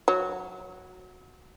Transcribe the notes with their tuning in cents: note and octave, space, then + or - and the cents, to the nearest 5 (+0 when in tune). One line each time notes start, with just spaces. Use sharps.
F#3 -10